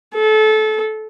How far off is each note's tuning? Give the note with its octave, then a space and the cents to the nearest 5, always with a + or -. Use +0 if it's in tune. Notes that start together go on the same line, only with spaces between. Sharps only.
A4 -25